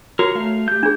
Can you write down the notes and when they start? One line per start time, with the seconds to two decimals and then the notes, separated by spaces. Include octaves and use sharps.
0.19 F#4 A#4 C#5
0.35 A3 F5
0.68 G4 G6
0.83 D4 G#4